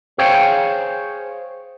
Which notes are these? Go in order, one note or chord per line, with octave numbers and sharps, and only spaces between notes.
G#4 C5 C#5 F5 G5